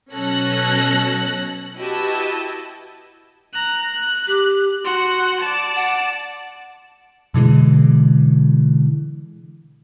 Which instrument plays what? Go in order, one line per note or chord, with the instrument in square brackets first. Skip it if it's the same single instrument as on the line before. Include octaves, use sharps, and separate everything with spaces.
[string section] B2 F#3 C#4 A4 F#6 A#6
E4 F#4 G4 B4 D#5 A5
[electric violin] A#5 F#6
F#6
[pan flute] G4
[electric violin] F#4 F#5 [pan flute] C6
[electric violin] D5 A5
[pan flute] F#5
[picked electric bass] B2 D3 E3 G#3